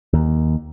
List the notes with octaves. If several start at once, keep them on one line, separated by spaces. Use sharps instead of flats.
D#2